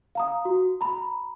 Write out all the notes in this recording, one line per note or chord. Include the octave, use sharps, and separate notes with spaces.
F5 A#5 D#6
F#4
A#5 B5